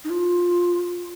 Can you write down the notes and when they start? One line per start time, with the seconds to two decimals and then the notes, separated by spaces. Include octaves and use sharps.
0.04 D#4
0.10 F4